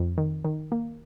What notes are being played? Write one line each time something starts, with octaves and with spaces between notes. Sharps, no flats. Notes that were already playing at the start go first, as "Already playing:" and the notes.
Already playing: F2
D#3
D#3
A#3